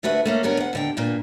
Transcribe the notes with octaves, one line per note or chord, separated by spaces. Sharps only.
D2 A3 F#4 B4 E5
A3 A#3 C#4
G2 D3 B3 A#4 C#5
D2 F#5
D#2 D3 G5
G2 A#2 D3